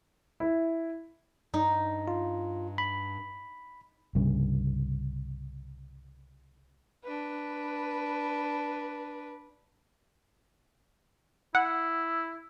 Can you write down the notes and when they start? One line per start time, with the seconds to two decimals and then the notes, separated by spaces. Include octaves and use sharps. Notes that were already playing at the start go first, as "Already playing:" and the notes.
0.40 E4
1.54 G2 D#4
2.08 F4
2.78 B5
4.15 C2 G2 C#3
7.04 D4 B4
11.55 E4 F#5